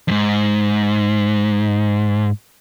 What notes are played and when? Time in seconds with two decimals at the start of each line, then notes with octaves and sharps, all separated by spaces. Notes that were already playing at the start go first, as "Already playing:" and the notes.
0.08 F2 G#2